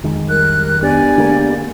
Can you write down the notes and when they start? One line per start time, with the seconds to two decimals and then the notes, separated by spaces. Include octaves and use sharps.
0.03 F2 D#3 G#3
0.29 G3 A#4 F#6
0.83 B3 D4 G4 D5 G#5
1.17 D3 G#3 A#3